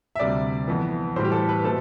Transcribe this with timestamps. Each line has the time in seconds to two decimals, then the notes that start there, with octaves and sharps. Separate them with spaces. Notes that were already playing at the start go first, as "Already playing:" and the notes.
0.16 E5
0.19 D2 C3 G3 D5
0.68 F2 E3 B3
1.16 A2 E3 G3 C5
1.25 G4
1.32 A4
1.49 B4
1.64 B2 A3 C4 A4